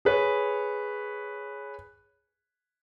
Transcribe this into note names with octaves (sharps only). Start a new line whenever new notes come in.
G#4 B4 C#5